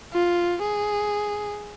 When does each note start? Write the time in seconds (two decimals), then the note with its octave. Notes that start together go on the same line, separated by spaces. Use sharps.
0.13 F4
0.62 G#4